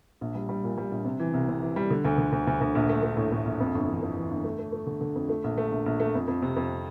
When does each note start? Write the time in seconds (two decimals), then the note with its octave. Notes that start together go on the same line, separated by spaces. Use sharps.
0.21 A#1
0.35 G3
0.49 G3
0.64 A#2
0.78 G3
0.92 A#1
1.05 C3
1.20 E3
1.34 C2
1.49 C3
1.62 E3
1.76 G3
1.91 D3
2.05 D2
2.18 D3
2.32 D2
2.47 D2
2.61 D2
2.75 A#1
2.89 A3
3.03 A3
3.17 A2
3.32 A2
3.46 A#1
3.60 F2
3.75 G1
3.88 E3
4.02 F2
4.17 E3
4.31 G1
4.44 A3
4.59 A3
4.72 A3
4.87 D3
5.01 D3
5.15 F2
5.29 A3
5.44 A#1
5.58 A3
5.72 A#1
5.86 A#1
6.00 A3
6.15 F2
6.28 F2
6.42 C3
6.56 F2